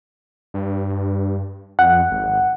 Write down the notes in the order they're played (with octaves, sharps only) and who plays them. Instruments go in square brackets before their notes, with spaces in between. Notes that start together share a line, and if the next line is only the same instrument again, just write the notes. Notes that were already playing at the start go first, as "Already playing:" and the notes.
[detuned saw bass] G2
[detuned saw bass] F2 [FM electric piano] F#5
[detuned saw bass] G#1